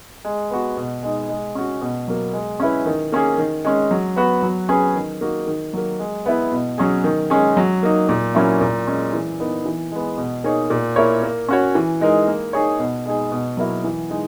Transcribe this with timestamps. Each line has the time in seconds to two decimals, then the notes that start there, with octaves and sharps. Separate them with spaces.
0.25 G#3
0.50 B3 F#4
0.77 B2
1.03 G#3 D#4
1.29 G#3
1.55 C#4 F#4
1.81 B2
2.08 F#3 A#3
2.33 G#3
2.60 C#4 E4 B4
2.86 D#3
3.12 A#3 C#4 G#4
3.38 D#3
3.65 G#3 C#4
3.91 F#3
4.16 B3 F#4 B4
4.43 F#3
4.69 C#4 G#4 B4
4.95 D#3
5.21 A#3 D#4 F#4
5.47 D#3
5.73 F#3 A#3
5.99 G#3
6.26 B3 E4 B4
6.52 B2
6.78 F#3 C#4 G#4
7.04 D#3
7.30 G#3 C#4 G#4
7.57 F#3
7.83 A#3 D#4
8.09 A#2
8.35 F#3 A#3 C#4 E4
8.61 A#2
8.87 G#3 C#4
9.13 E3
9.39 B3 D#4 A#4
9.65 E3
9.92 G#3 B3
10.18 B2
10.44 A#3 D#4 G#4 C#5
10.70 A#2
10.96 A#3 E4 A#4 C#5
11.23 A#3
11.48 C#4 F#4 C#5
11.75 E3
12.01 G#3 D#4 A#4
12.27 A#3
12.53 D#4 G#4 C#5
12.79 B2
13.05 G#3 D#4 G#4
13.32 B2
13.57 F#3 A#3 E4 A#4
13.84 E3
14.10 G#3 D#4